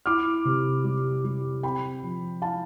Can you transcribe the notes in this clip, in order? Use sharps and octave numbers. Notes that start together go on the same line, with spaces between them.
E4 D6 F6
C3
G3
G3
C4 G5 B5
F3
E4 F5 A5